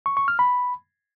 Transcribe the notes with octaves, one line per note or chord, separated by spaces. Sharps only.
C#6
C#6
F6
B5